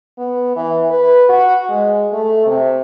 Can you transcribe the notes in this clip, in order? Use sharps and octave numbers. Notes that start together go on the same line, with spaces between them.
B3
E3
B4
F#4
G#3
A3
C3